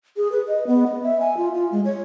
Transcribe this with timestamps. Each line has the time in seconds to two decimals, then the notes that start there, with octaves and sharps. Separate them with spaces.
0.17 G#4
0.32 B4
0.48 D#5
0.67 B3
0.87 D#5
1.03 E5
1.21 G#5
1.37 F4
1.54 F4
1.72 G#3
1.85 C#5